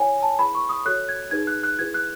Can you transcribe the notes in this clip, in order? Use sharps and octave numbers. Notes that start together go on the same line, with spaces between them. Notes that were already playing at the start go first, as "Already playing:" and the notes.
Already playing: E4 A4 C#5 G#5
A5
E4 G#4 B4 B5
C#6
D#6
F#4 A4 C#5 F#6
G#6
D#4 G#4 B4 G#6
F#6
F#6
E4 G#4 B4 G#6
F#6